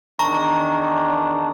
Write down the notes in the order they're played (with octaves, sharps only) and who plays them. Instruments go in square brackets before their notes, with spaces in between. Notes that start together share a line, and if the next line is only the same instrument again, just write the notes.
[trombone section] E2 D#3 D4 [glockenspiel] A5 C#6 [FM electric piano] A#5